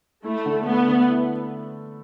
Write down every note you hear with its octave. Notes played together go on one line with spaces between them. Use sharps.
A3 E4
D3
A3 B3
D3
E4